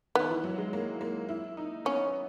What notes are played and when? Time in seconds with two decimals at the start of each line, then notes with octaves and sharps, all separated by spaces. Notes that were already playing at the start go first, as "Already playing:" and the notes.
0.15 D#3 B3
0.30 E3
0.44 F#3
0.58 G#3
0.73 A#3
1.01 A#3
1.29 E4
1.57 D#4
1.85 B3 C#4